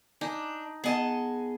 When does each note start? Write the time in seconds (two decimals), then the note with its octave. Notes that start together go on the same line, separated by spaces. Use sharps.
0.21 D4 D#4 G#5
0.84 B3 G#4 D#5 F#5 G#5 A5